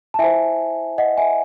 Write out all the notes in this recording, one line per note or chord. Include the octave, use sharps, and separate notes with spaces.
A5
E4 C5 E5 G#5
D#5 F#5
E5 G#5